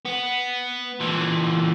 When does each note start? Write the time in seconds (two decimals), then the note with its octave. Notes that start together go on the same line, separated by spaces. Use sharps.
0.05 B3
1.01 A#2 E3